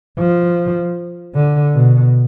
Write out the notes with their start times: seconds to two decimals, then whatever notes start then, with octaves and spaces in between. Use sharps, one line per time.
0.18 F3
1.35 D3
1.74 B2